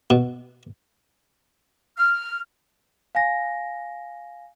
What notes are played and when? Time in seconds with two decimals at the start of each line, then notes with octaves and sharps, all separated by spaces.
0.10 B2
1.97 F6
3.15 F5 G#5 A#6